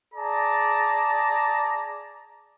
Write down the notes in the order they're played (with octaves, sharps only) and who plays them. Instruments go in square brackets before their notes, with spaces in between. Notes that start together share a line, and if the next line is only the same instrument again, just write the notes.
[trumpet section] G#4 D5 A5 A#5